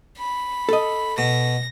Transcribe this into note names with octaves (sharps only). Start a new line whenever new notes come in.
B5
A4 D#5
B2 A#6